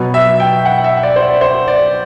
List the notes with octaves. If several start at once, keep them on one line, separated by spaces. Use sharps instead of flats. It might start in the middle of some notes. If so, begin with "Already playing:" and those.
Already playing: B2 F#3 B3
E5
G5
F#5
E5
D5
C5
D5
C5
D5